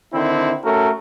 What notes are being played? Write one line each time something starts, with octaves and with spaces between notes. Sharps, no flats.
D3 D#3 C4 E4
A3 C#4 F#4 A4 A#4